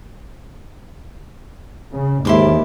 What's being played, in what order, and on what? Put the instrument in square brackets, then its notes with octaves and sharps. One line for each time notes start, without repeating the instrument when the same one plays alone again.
[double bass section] C#3
[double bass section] D#2 [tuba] G#2 [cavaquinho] E4 C6 D6